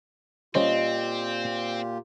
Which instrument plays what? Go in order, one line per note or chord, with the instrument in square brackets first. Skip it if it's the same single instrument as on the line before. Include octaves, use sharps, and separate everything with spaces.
[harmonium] A#2 F4 G4 [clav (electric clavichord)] G3 C#4 C5 [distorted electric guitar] C4 [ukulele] D#5